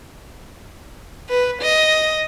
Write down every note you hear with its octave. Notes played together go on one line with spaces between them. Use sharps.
B4
D#5